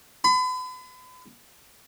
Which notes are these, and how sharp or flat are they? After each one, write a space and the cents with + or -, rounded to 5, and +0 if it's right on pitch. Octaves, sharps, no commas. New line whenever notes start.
B5 +40